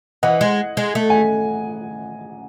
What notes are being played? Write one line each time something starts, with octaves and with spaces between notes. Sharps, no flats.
E3 D#5 F#5
G#3
G#3
A3
G#5